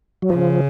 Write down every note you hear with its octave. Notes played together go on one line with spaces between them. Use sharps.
F#3
C#3 F3